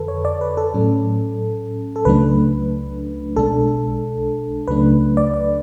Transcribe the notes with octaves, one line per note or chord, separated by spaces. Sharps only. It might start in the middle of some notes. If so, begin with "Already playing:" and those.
Already playing: F2 D3 A4 B4
C#5
D5
B4
A4
A2 F#3 C#4
A4
C#2 C#3 F#3 A3 D4 B4
B1 B2 G#3 D4 A4
C#2 C#3 F#3 A3 D4 B4
D5
D5